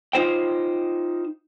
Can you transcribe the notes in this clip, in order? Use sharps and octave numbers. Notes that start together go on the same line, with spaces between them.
D#4 F4 C5 G5